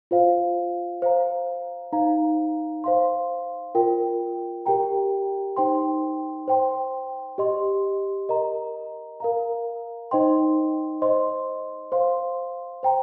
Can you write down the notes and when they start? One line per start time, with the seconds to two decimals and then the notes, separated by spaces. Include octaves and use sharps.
0.11 F4 C5 F5
1.02 C5 F5 A#5
1.93 D#4 C5 F5 A#5
2.84 C5 F5 C6
3.75 F4 A#4 G5
4.66 G4 A#4 G5 A#5
5.56 D#4 C5 G5 C6
6.48 C5 G5 C6
7.38 G4 D#5 C6
8.29 A#4 D#5 A#5
9.20 A#4 F5 A#5
10.11 D#4 C5 D#5 G5 C6
11.02 C5 D#5 C6
11.92 C5 F5 C6
12.83 C5 G5 A#5